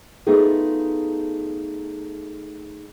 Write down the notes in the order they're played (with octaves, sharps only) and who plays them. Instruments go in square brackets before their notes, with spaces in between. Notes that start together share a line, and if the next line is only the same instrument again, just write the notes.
[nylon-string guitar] A3 B3 D#4 F4 G#4 A4